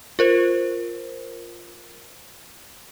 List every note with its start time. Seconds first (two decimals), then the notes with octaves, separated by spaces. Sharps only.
0.19 F4 A#4 C5